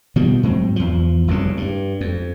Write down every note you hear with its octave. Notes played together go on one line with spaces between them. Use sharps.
B2 D#3 F3 G3
G#2 F#3 C4
E2 F3
F1 C2 F#2 C#3
G2
F2